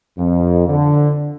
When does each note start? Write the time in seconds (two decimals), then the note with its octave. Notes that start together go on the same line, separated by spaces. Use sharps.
0.18 F2
0.68 D3